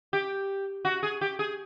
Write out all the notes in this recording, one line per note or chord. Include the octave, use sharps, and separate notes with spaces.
G4
F#4
G#4
G4
G#4